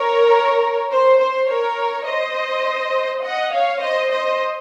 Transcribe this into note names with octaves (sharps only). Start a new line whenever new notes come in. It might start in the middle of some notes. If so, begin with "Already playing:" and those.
Already playing: A#4 C#5
C5
C5
A#4 C#5
C5 D#5
D#5 F#5
C#5 F5
C5 D#5
C5 D#5